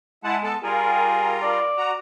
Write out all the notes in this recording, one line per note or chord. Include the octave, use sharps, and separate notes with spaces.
G#3 E4 F#5 A5
B3 A4 A5
G3 F4 G#4 A#4
D5
F#4 A#5